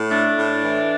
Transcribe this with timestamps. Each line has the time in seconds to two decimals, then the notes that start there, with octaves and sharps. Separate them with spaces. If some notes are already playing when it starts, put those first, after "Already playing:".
Already playing: A2
0.10 A3 D4
0.37 A2
0.64 E3